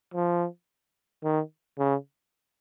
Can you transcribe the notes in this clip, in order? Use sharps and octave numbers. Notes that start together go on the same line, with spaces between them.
F3
D#3
C#3